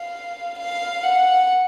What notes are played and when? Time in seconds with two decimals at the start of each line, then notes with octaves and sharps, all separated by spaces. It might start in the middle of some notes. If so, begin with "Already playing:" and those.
Already playing: F5
0.59 F5
1.03 F#5